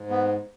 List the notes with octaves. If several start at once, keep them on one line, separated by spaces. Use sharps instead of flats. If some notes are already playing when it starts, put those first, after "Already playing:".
Already playing: G#2
B3